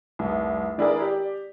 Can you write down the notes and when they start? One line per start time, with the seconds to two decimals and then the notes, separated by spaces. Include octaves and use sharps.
0.19 F1 C2
0.78 E3 D4 E4 G#4 A#4 D5
1.02 G4 D5